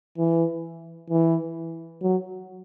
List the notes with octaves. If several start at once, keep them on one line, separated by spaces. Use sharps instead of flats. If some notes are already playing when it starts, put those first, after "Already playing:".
E3
E3
F#3